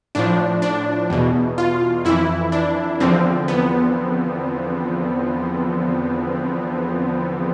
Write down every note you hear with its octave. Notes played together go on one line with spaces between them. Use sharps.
A2 F3 D4
D4
E2 B2
F4
F2 E3 E4
D4
E2 D3 F3 C4
B3